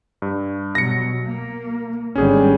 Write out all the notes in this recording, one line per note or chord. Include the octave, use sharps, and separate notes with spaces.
G2
B2 F#3 A#6 C#7
A#3
G#1 D3 G3 C#4 G#4